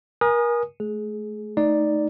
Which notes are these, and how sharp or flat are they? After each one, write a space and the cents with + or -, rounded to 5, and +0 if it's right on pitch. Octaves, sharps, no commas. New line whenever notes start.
A#4 +35 G#5 +0 D#6 -20
A3 -30 G#4 +20
A3 +0 D#4 +0 D5 +0